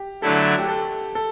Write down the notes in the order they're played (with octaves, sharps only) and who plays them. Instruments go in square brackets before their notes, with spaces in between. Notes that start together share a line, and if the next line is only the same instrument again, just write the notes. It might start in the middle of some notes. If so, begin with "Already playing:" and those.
Already playing: [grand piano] G4
[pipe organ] D3 F#3 A3 E4 [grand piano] A4
[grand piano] G4
A4
A4